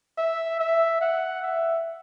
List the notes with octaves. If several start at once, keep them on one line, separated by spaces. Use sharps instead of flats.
E5
E5
F#5
E5